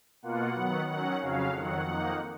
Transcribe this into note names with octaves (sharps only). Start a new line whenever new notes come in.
B2 A#3 F4 F#5
D#3 F#3 B3
D#3 F#3 C#4 F#5
F2 C#3 F#3 C#4 F5
F2 D#3 F#3 F#5
F2 D#3 A#3 D#4